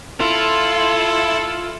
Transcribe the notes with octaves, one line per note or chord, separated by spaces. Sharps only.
E4 F4 A4